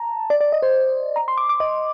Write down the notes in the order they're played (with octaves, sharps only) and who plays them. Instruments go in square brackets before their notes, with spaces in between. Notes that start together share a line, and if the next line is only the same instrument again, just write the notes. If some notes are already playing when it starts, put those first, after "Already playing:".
Already playing: [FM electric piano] A5 A#5
D5
D5
D#5
C5
A#5
C6
D6
D6
D#5